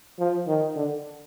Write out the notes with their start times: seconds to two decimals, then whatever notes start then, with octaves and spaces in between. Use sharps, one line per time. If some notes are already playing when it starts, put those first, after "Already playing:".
0.19 F3
0.47 D#3
0.75 D3